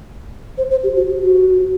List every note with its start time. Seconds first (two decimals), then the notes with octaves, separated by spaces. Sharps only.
0.58 C5
0.71 C5
0.83 G4
0.97 F#4
1.09 G4
1.22 F#4